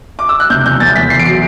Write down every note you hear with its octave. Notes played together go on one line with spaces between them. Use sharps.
D6
E6
F#6
C3 G6
E2 G6
E2 A6
E2 B6
E2 C7
D7
F#3 C7